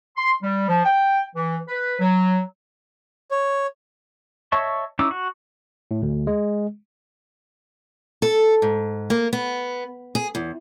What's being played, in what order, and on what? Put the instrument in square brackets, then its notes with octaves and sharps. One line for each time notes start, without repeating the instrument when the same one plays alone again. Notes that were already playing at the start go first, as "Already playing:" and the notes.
[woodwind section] C6
G3
F3
G5
E3
B4
F#3
[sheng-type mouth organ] C#5
[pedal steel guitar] C#5 D#5 E5 A5 C#6
C#4 D#4 E4 D6 E6
F#4
[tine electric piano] A2
D2
G#3
[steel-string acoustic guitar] A4
G#2
A#3
B3
G#4
E2